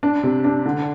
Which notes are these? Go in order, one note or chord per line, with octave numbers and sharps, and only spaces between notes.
D4
C3
D4
D3